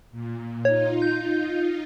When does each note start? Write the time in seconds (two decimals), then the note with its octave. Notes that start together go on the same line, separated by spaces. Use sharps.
0.11 A#2
0.65 D#4 F4 C#5
1.02 G6